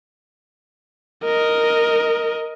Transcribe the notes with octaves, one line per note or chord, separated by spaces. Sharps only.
A#4 D#5